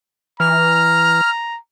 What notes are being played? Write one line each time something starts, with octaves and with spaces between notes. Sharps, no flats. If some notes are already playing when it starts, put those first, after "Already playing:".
E3 A#5 F6